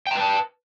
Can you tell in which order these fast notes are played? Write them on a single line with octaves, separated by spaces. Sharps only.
G5 A#5 B4 A5